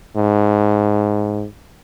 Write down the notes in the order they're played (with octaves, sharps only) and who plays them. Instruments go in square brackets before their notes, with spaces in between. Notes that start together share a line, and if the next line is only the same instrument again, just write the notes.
[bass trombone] G#2